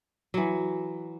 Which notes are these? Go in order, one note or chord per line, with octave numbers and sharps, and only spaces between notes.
E3 F#3